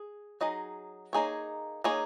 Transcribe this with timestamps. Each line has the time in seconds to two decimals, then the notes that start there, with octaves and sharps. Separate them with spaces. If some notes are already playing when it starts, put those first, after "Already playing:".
Already playing: G#4
0.41 F#3 D#4 G#4 D#5
1.13 A#3 D#4 G#4 C#5
1.84 A#3 D#4 G#4 C#5